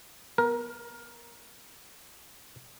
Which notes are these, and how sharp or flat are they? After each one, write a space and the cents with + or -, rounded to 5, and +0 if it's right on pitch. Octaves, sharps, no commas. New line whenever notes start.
B3 -15 A#4 +15